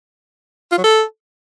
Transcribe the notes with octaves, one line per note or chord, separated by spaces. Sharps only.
F4
F#3
A4